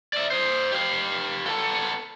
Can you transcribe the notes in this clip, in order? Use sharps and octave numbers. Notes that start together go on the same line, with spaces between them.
D5 E5
C5 D#5
G4 F5
B3 A4